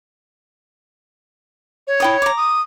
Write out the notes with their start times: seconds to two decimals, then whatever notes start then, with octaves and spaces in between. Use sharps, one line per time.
1.87 C#5
2.00 E4 G5 D#6
2.22 A#5 D6
2.36 D#6